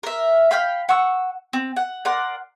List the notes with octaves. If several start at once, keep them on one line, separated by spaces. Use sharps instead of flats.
A#4 E5
F5 G5 B5 F6
F#5 C#6 E6
C4
F#5
A#4 D5 F#5 C6